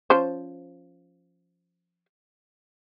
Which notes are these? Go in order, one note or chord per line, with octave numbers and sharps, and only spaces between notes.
F3 C#4 C5